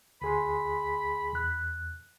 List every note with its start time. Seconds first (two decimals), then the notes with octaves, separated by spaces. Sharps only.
0.22 D2 G#4 B5 C6
1.33 E2 F#6